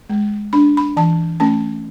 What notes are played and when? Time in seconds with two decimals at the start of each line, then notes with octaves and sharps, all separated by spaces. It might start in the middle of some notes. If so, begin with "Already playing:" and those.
0.10 G#3
0.53 D4 B5
0.77 B5
0.97 E3 A5
1.40 A3 C#4 A5